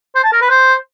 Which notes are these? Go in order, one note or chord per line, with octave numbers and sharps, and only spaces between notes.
C5
A5
A#4
B4
C5